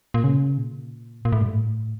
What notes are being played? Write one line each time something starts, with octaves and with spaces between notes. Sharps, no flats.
A#2
C#3
A#2
A#2
A2
G2
A2